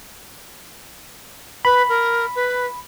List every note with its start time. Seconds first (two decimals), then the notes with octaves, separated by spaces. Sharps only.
1.65 B4 B5
1.89 A#4
2.35 B4